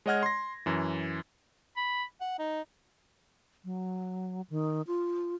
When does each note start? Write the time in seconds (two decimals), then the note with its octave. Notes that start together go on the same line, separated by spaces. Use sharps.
0.06 G#3 C#5 D#5 F#5 F6 G#6
0.23 C6 A#6
0.66 F#2 E3
1.77 B5
2.21 F#5
2.39 D#4
3.64 F#3
4.50 D#3
4.87 F4